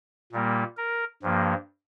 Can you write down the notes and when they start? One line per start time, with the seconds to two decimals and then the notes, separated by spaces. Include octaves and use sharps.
0.32 A#2 G3 A#3
0.77 A#4
1.23 G2 F3 A#3